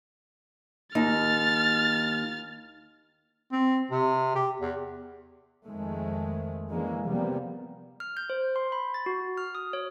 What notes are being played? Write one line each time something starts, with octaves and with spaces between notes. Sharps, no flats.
D#2 D#4 F6 A6
C4
C3
G4
E2
F2 D#3 G#3 A3
D3 E3 G#3 A#3 C#4
C3 F3 G3 A#3 B3
F6
G6
C5
C6
B5
A6
F#4
F6
D#6
C#5